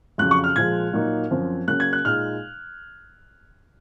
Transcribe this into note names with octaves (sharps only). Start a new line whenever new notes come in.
F2 C#3 F#3 F#6
C#6
F6
A#2 F3 G#3 G#6
A#2 F#3 A#3 D#4
F#2 F3 C4
C#3 F#3 A#3 C#4 F#6
G#6
F#6
A#2 G#3 D#4 F6